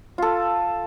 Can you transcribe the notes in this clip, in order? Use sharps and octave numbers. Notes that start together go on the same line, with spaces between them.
F4 A4